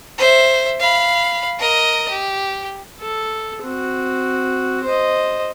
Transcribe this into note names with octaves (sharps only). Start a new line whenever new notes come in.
C5 E5
F5 B5
A#4 D#5
G4
A4
C4 F#4
C5 D#5